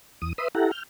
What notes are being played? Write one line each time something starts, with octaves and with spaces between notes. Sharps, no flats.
E2 D#6
B4 E5 B5 C6 D#6
E4 G4 A4 F#5 A#5
F6 G6